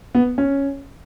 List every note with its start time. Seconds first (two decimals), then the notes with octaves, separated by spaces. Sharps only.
0.15 B3
0.38 C#4